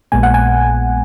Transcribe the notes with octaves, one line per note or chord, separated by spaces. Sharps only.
A#1 A#2 G#3 B3 G#5
F#5
G#5